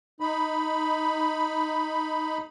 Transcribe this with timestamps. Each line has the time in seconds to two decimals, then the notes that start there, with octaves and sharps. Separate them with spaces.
0.20 D#4 B5